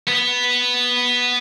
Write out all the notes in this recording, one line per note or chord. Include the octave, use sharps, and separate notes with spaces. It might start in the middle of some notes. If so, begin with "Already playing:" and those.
B3